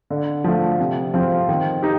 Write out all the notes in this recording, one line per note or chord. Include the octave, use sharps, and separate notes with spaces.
D3
F3 A3
C3
F3 C4 F4
D#3
D#4 G4